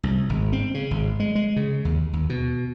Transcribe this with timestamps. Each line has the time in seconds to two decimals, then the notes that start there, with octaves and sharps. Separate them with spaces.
0.03 C2
0.29 G#1
0.53 C4
0.74 C#3
0.91 G#1
1.20 G#3
1.35 G#3
1.56 C#3
1.85 D#2
2.13 D#2
2.30 B2